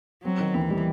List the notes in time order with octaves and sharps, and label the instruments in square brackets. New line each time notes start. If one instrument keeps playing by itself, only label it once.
[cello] F#3 [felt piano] C4
[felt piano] D#3
[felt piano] D#2 [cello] E3
[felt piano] G3